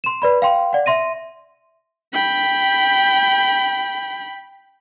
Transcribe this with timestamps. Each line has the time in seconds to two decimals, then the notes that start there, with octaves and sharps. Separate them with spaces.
0.04 C6 E7
0.22 B4 D5 B5
0.42 F5 G5 C6
0.73 D5 F#5
0.86 E5 C6 A#6 D#7
2.14 G5 B5